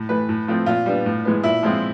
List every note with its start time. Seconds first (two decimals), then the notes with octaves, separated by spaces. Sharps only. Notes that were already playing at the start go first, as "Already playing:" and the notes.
Already playing: A2
0.09 E3 A3 B4
0.29 A2
0.48 F3 A3 C4
0.66 A#2 F4
0.86 G3 B3 D4
1.06 A2
1.25 E3 G#3 B3
1.43 A#2 E4
1.63 F3 G#3 C4